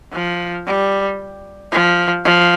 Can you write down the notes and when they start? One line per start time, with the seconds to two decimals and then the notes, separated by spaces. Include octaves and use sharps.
0.13 F3
0.67 G3
1.72 F3
2.25 F3